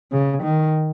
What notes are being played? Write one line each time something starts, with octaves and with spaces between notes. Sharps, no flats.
C#3
D#3